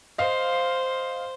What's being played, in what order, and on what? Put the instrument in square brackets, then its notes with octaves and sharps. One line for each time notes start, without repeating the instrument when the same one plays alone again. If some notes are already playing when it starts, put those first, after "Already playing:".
[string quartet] C5 [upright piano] D#5 F5